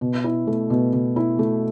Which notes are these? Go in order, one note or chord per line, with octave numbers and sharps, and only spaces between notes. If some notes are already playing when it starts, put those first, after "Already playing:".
B2
E4
A3
B2
B2
E4
A3